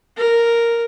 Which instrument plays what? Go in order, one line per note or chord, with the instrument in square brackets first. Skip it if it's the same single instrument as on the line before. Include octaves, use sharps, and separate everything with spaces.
[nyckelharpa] A#4